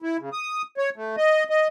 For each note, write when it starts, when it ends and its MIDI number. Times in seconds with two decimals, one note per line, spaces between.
0.02 0.17 64
0.20 0.30 49
0.33 0.62 87
0.77 0.90 73
0.96 1.16 57
1.17 1.44 75
1.50 1.68 75